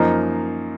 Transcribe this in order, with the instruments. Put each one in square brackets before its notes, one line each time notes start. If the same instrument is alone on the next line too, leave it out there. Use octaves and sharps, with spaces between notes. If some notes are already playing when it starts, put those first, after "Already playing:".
Already playing: [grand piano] F#2 F3 A#3 D#4